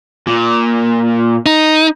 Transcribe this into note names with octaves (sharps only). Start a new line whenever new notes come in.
A#2
D#4